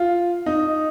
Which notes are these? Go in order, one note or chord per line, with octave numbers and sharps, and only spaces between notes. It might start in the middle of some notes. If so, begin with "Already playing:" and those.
Already playing: F4
D#4